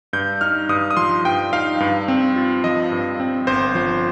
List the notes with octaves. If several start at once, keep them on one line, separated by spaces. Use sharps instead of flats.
G2 G6
D#4 F6
G2 D#6
D#6
F3 C6
G2 G5
D#4 F5
G2
C4
F4
F3 D#5
G2
C4
G1 C5
F3